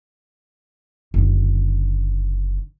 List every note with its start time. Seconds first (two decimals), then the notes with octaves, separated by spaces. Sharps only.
1.14 F#1 D3